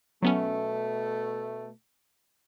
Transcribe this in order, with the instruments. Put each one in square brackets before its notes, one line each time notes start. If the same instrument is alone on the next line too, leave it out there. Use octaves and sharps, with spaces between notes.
[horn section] B2 A3 [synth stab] F#3 B3 C#4